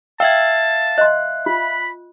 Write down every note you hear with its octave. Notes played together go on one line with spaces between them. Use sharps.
E5 F5 G5 A5 E6 G#6
D#5 C6 F#6
F4 B5